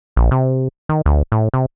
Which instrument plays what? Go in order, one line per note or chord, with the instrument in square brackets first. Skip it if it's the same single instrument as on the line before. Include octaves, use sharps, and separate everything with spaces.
[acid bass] A#1
C3
D#3
D2
A2
C3